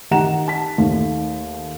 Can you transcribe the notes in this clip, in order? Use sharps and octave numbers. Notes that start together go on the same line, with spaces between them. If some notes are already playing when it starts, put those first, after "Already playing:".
D#3 G4 F#5 A#5 E7
A5 B6
D#2 D#3 A3